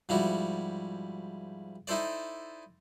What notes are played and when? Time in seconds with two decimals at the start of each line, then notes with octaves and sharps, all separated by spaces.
0.09 G#2 F3 G3 E4 F#4
1.87 D#4 E4 A4 C5 D5